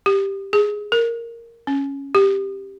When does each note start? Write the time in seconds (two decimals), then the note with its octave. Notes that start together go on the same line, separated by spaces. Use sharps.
0.06 G4
0.53 G#4
0.92 A#4
1.67 C#4
2.15 G4